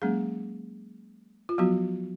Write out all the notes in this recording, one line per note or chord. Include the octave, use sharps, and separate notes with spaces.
F#3 G#3 A#3 C#4 G#4
F4
F3 F#3 B3 F#4